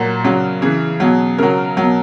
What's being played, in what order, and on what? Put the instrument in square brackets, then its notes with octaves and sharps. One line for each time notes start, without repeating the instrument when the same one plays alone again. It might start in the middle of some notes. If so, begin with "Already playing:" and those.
Already playing: [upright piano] A#2 F#3 F#4
C#3 F#3
C#3 E3 G#4
B2 F#3
C#3 F#3 A#4
B2 F#3